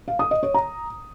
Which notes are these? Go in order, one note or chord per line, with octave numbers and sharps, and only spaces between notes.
F5
D#6
D#5
C#5
A#5